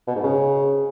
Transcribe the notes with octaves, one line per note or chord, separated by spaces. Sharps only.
B2
G#2
C#3